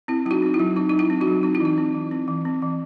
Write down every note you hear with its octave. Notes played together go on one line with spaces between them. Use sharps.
C4 E4
F#3 E4
D#4 F#4
C4 D#4
E4
F#3
C4 D#4
F#3 D#4
E4
C4
D#4 F#4
F#3
C4 D#4
E4
E3 D#4
C4
E3
C4
E3
C4
E3